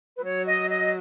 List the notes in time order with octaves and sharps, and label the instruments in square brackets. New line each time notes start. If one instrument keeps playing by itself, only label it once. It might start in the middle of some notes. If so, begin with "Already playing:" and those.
[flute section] B4
[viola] F#3 [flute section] C#5
[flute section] D#5
D#5